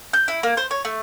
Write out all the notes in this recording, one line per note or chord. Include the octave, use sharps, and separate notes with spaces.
G6
E4
A#3
C5
C#5
A3